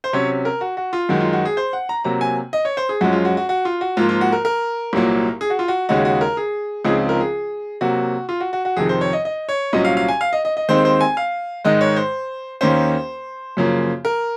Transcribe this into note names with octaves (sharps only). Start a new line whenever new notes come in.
C5
C3 F#3 C#4 C#5
A#4
F#4
F#4
F4
F#2 D#3 G#3 D#4 F#4
F4
F#4
G#4
C5
F#5
A#5
C3 F#3 A#3 A#5
G#5
D#5
C#5
C5
G#4
F#2 F3 G#3 C#4 F#4
F4
F#4
F#4
F#4
F4
F#4
G#2 F3 A#3 F4
F4
F#4
A#4
A#4
C2 A#2 F#3 A#3
G#4
F#4
F4
F#4
D#2 C#3 G#3 D#4 F#4
F#4
A#4
G#4
C#2 C#3 F3 C4 D#4 G#4
A#4
G#4
C3 F#3 A#3 F#4
F4
F#4
F#4
F#4
F2 C3 D#3 G#4
C5
C#5
D#5
D#5
C#5
C2 A#2 F#3 C#4 D#5
F5
F5
G#5
F5
D#5
D#5
D#5
D#2 D#3 G#3 C4 D#4 C5
C5
G#5
F5
G#2 D#3 G#3 D#5
C#5
C5
D#2 D#3 A#3 C#4 C5
F#2 C#3 F3 A#3
A#4